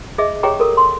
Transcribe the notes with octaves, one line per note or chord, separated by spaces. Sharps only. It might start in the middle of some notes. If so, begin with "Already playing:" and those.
G#4 D#5 E5 D6
G4 G#4 C#5 G5 A#5 D6
A4 A#4
C6